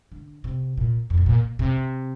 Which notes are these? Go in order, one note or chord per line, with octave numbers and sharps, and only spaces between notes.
D3
C3
A#2
F2
A2
A#2
C3